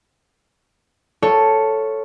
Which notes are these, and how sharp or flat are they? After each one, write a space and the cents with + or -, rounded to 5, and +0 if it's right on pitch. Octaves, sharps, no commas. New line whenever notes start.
F4 +0 A4 +0 C#5 +0